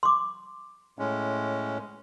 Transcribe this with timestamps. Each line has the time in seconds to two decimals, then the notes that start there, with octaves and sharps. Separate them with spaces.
0.03 C6 D6
0.99 A2 G#3 C#4